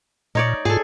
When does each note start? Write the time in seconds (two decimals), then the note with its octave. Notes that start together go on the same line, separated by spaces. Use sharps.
0.35 A#2 D#4 C#5 D5
0.65 G#2 F4 G#4 A4